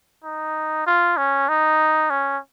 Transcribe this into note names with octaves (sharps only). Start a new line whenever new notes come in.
D#4
F4
C#4
D#4
C#4